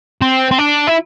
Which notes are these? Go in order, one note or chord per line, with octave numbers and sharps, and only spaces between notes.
C4
C4
D4
E4